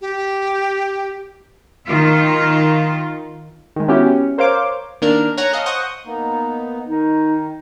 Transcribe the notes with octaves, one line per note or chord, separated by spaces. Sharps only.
G4
D#3 F4
D#3 G#3
B3 C#4 E4 F#4 G4
C#4
A#4 C5 C#5 F5 C6 D6
D#3 A#3 D4 A#4
C#5 F#5 G#5 A#5
A4 D#5 F5
C5 F#5 C#6 D#6
A#3 B3 D#4
D#3 D#4